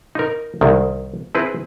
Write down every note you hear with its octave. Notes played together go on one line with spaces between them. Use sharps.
D#4 A#4
C2 D#3
C4 E4 G#4 B4